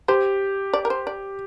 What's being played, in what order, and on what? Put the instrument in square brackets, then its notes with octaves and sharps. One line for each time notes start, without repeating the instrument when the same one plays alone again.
[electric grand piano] G4 [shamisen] C5
[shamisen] D5
A#4
C5
D5